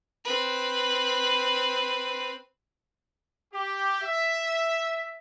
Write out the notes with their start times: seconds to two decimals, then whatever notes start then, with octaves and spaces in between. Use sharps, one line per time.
0.25 C4 B4
3.53 G4
4.02 E5